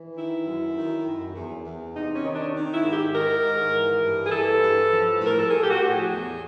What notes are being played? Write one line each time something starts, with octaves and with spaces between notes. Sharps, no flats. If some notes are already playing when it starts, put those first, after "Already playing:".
Already playing: E3
D#3 E4
F#2
D#3
F#2
E2
E2
C3 D#4
C#4
D#3
D4
D#3
E4
G#2
G4
D#3 A#4
G#2
E3
G2
G#4
E3 A4
G2
F3
A2 A#4
A4
F3 G#4
G4
F#4
A2 G4
G#4
E2